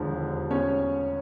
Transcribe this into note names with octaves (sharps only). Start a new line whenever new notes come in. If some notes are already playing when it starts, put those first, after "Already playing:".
Already playing: E1 D#2 D3 F3
C#4 C#5